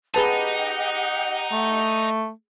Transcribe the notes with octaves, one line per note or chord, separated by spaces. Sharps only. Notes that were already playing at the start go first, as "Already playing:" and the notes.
D#4 G4 G#4 B4 D#5 F#5 A5
A3